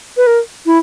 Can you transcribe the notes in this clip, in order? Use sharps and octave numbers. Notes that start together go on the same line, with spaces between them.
B4
A#4
E4